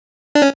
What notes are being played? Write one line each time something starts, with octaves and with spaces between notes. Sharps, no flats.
D4
C#4